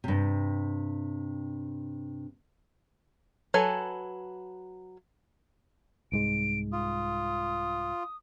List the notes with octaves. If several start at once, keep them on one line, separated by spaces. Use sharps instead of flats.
G2 C3
F#3 A4 B4 G#5
C2 G#2 G#3 D7
F4 D#6